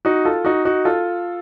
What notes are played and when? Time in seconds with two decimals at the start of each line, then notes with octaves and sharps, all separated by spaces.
0.05 D#4 F#4
0.25 F4 A4
0.45 D#4 F#4
0.65 D#4 F#4
0.85 F4 A4